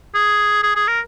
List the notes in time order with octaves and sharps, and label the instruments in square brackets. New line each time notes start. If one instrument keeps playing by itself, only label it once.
[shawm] G#4
G#4
G#4
A#4